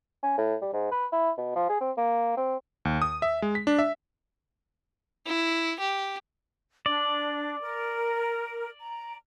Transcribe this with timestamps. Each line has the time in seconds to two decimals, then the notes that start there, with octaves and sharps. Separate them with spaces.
0.23 C#4
0.37 A2
0.62 G3
0.73 G#2
0.91 B4
1.12 E4
1.37 B2
1.55 F3
1.69 G#4
1.81 C4
1.97 A#3
2.37 C4
2.85 D#2
3.02 D#6
3.22 E5
3.42 G#3
3.55 B6
3.67 D4
3.79 E5
5.26 E4
5.80 G4
6.86 D4 D5
7.62 A#4
8.80 A#5